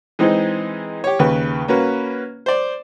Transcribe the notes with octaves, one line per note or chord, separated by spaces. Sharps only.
E3 G#3 C4 D#4
G4 C#5
D#2 C#3 B4
A#3 C#4 F#4 B4
C5 D5